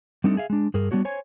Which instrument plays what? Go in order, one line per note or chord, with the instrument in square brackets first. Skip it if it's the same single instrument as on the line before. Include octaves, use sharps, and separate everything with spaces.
[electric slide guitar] G3 A3 C4 D4 D#4 A4
G#4 E5 F5
G#3 D4
G2 G#4 A#4
G3 B3 D4 F#4 C#5
C5 C#5 G#5